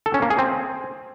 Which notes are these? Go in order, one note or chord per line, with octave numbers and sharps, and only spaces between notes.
A4
C#4
A#3
G#4
C4